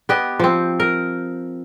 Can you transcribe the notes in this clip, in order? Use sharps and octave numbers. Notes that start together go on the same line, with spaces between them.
B3 G4 D#5
F3 C4
A#4